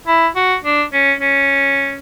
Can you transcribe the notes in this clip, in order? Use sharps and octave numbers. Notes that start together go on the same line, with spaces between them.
E4
F#4
D4
C#4
C#4